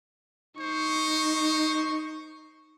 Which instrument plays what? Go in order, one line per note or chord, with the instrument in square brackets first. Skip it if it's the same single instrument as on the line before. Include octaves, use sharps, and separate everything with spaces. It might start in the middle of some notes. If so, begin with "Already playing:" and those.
[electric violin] D#4 C#6 [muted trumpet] C5